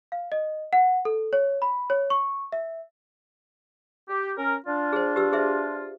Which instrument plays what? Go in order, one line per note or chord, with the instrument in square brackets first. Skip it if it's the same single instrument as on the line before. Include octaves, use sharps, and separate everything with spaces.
[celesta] F5
D#5
F#5
A4
C#5
B5
C#5
C#6
E5
[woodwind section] G4
C#4 A#4
D4 F4
[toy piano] G#4 C5
G4 B4 E6
G#4 C5 E5